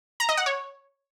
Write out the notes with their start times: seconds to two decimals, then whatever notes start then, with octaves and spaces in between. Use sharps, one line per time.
0.20 A#5
0.29 D#5
0.37 F#5
0.46 C#5